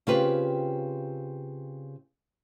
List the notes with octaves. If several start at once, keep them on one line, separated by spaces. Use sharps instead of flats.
C#3 C4 F4 G4 B4